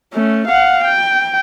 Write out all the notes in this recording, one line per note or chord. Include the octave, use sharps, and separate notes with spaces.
A3 C#4
F5 F#5
G5